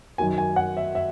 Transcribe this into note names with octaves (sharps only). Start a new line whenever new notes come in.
F#2 D#3 F#3 G#5
G#5
F#5
E5
E5